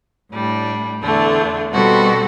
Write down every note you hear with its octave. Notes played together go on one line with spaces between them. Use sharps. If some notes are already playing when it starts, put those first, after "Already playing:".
A2 G3 D4
E2 D3 A3 D4
B2 G3 C4 F#4 A4